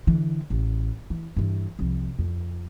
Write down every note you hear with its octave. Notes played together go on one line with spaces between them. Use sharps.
D3 E3
A1
E3
G2 E3
C2 F3
F2